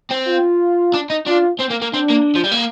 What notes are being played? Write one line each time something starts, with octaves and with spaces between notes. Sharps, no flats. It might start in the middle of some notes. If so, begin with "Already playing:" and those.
C4
F4
D4
D#4
D4 F4
C4
A#3
A#3
C4 D4
A#3
F3
G3
A#3